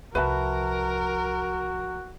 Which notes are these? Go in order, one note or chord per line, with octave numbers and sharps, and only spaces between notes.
C2 F3 F#4 A#4 B4 E5 A5